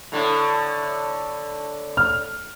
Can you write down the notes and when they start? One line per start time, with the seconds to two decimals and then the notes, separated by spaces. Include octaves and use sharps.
0.12 A2 D3
1.97 F6